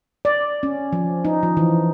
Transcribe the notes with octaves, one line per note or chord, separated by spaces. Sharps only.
D5
C#4
F3
D#4
F3
E3